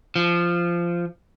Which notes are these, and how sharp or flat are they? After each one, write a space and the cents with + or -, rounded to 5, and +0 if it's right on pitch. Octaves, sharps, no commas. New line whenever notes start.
F3 -15